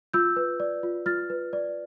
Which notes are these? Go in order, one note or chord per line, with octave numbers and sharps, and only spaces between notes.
F4 E6 G6
B4
D5
F4
F4 F6 A6
B4
D5